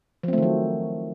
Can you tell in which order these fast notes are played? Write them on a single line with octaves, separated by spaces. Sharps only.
F3 C4 A3 D#3 F#3